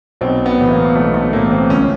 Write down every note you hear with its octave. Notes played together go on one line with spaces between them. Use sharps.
B1 C4
B3
A2 E3
A#3
B1 A3
A3
A2 E3 A#3
C4
C#2 C#4